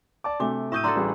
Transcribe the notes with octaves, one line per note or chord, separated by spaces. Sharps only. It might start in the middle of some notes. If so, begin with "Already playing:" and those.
D5 A5 D6
C3 A3 D4 F#4 D6
A2 E5 C#6 D#6 E6 G6 D#7
D4 F#4 A4 A#5 C6 E6
A1 G3 G#4